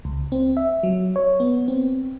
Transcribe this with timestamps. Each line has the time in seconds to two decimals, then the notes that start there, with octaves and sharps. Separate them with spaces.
0.05 C#2
0.32 C4
0.57 E5
0.83 F#3
1.16 C#5
1.40 B3
1.68 C4